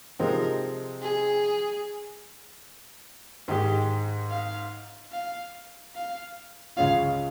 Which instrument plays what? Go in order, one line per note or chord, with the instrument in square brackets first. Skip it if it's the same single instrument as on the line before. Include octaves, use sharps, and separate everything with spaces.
[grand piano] C3 F3 G#3 C4 D#4 [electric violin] A#4
[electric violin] G#4
[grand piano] G#2 D#3 G#3 D#4 [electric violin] G4
[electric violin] F5
F5
F5
[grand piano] C#2 C#3 G#3 C#4 F4 [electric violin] F5